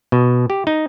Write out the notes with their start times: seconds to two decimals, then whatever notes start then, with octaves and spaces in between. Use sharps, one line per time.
0.12 B2
0.50 G4
0.67 D#4